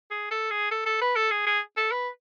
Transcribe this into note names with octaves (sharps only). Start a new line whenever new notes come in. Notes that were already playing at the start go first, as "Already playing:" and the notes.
G#4
A4
G#4
A4
A4
B4
A4
G#4
G#4
A4
B4